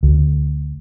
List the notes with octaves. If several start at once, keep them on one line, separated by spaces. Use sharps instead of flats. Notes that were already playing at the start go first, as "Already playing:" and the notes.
D2